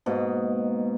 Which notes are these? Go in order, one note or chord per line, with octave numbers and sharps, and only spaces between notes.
G#2 B2 A#3